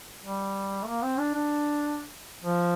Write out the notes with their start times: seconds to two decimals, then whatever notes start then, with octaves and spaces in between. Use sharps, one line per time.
0.24 G3
0.83 A3
0.87 A#3
1.03 C4
1.19 D4
1.34 D4
2.43 F3